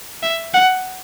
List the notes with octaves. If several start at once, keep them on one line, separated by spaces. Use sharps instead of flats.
E5
F#5